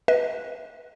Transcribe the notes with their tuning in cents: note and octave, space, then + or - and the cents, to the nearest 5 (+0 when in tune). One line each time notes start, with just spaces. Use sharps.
B4 -15 D#5 +30